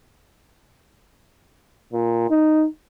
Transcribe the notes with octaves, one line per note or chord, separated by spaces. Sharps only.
A#2
D#4